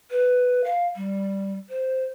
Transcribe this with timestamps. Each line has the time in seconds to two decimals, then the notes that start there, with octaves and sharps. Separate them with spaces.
0.11 B4
0.64 F5
0.96 G3
1.70 C5